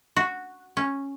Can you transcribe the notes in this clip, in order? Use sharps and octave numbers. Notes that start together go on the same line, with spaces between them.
F#4
C#4